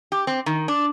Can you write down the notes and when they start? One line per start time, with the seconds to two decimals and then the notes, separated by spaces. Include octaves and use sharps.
0.12 G4
0.27 C4
0.46 D#3
0.68 D4